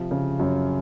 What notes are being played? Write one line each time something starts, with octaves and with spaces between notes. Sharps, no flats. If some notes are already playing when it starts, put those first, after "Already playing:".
Already playing: C3 F3
C#3
F#2